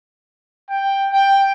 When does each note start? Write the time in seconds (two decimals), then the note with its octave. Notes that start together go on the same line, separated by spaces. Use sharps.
0.70 G5
1.13 G5